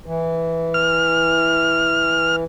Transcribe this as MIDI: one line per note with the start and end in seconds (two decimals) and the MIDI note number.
0.06 2.44 52
0.74 2.36 89